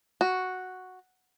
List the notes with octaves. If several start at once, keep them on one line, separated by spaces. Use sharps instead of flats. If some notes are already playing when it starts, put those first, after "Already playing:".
F#4